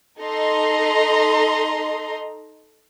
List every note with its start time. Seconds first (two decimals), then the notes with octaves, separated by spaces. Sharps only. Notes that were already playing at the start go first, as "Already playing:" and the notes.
0.20 D#4 A4 D#5 A#5 C6